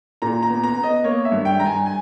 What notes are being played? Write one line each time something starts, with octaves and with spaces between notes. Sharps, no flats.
A#2 A#5
A#5
B3
A#5
B3
D#5
A#3 C#5
E5
G2
G5
G2 A#5
G#5
G#5